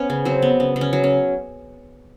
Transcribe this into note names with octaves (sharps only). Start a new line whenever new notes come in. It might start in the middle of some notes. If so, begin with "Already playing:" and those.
Already playing: B3 C#4
C#3
F#3 C4
B3
C#3
C#3
C#4
F#3
C#4